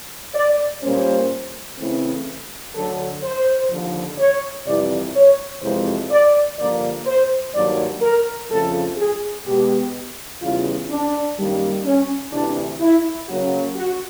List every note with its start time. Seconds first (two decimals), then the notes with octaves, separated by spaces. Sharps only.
0.35 D5
0.83 A#2 G3 A#3 C#4 C5
1.79 C#3 E3 A3 C4
2.75 D2 D3 F#3 A4
3.23 C5
3.70 D#2 D3 F3
4.19 C#5
4.66 F2 C3 E3 G3 D5
5.15 C#5
5.62 F2 C3 E3 G#3 C5
6.10 D5
6.58 G2 D3 F3 A#3 D5
7.06 C5
7.54 G2 D#3 F#3 A#3 D5
8.02 A#4
8.49 F2 C#3 F3 A3 A4
8.97 G#4
9.46 B2 G#3 B3 G4
10.41 E2 C#3 E3 G3 F4
10.90 D4
11.37 F#2 D#3 G3 A#3
11.85 C#4
12.32 D2 C3 E3 D4
12.81 E4
13.28 C#3 F#3 A#3 C#4 F#4
13.76 F#4